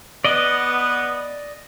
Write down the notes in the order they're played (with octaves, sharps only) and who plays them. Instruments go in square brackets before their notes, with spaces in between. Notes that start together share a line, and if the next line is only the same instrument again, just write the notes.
[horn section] B3 [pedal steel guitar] D5 D#5